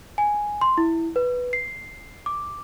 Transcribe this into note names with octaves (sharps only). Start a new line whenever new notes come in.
G#5
C6
E4
B4
C7
D6